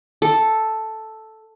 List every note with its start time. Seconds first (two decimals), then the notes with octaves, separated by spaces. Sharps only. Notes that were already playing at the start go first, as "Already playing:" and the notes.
0.22 A4